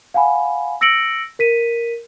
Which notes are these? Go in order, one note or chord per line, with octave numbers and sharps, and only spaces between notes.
F5 F#5 G#5 B5
E6 A#6 C#7 D7 F#7
A#4 B6 D#7